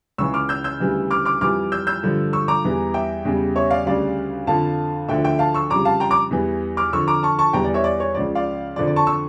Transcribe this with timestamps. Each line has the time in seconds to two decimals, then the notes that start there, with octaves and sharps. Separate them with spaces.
0.18 C#2 C#3 E3 C#6 E6
0.34 D6 F6
0.49 E6 G6
0.64 E6 G6
0.80 D2 C#3 E3 G3
1.11 D6 F6
1.25 D6 F6
1.41 F2 E3 G3 D6 F6
1.72 E6 G6
1.87 E6 G6
2.03 G2 D3 F3
2.33 C#6 E6
2.48 A#5 D6
2.64 E2 E3 G3
2.94 E5 G5
3.25 E2 C#3 G3
3.56 C#5 E5
3.71 D5 F5
3.86 D2 C#3 G3 D5 F5
4.47 F2 D3 F3 F5 A5
5.09 D2 D3 F3 E5 G5
5.24 E5 G5
5.39 F5 A5
5.54 C#6 E6
5.70 F2 C#3 G3 A#5 D6
5.85 F5 A5
6.00 G5 A#5
6.10 A#5 D6
6.31 E2 E3 G3
6.77 D6 F6
6.92 F2 D3 F3 C#6 E6
7.07 A#5 D6
7.23 A5 C#6
7.39 A5 C#6
7.53 E2 E3 G3 G5 A#5
7.64 D5
7.74 C#5 E5
7.84 D5
8.00 C#5
8.15 C#2 C#3 F3 D5
8.35 D5 F5
8.76 F3 D5
8.79 F2 D3
8.87 D5
8.96 A5 C#6
9.07 C#6 E6